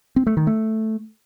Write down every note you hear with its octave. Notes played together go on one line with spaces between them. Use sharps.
C4
A3
D#3
A3